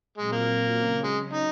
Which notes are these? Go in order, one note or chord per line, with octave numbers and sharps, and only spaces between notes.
A#2 F#3 G#3 C4 F4
A#3
C#3 F#3 C#4
G#3
D#4